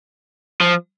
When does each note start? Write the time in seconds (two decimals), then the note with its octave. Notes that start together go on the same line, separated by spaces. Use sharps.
0.61 F3